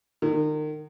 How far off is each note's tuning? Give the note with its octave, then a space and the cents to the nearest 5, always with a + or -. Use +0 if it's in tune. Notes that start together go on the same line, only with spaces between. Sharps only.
D#3 -35